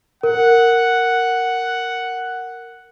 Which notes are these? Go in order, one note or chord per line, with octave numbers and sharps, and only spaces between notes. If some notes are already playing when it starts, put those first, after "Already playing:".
A#4 F#5